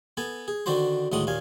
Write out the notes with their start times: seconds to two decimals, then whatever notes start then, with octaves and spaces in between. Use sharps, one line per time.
0.17 B3 A4 G#5
0.48 G#4
0.66 D3 D#3 D4 F#4 C5 C6
1.12 D2 A2 D#3 G#3 F#5 D#6
1.27 D#2 A#2 F5 G#5